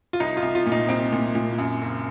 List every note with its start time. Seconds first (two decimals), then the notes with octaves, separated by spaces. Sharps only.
0.13 F4
0.20 C2 D#4
0.37 F4
0.42 C2
0.55 F4
0.66 A#2
0.72 D#4
0.89 C2 C4
1.13 A#2
1.35 A#2
1.58 F#2
1.81 F#1